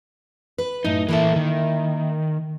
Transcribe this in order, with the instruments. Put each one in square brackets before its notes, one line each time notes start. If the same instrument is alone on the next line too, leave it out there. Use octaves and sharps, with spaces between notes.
[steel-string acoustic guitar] B4
[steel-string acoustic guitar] F#2 A2 [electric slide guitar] D#4
[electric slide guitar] E3 A4 [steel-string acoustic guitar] A#3 E4 E5
[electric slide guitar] D#3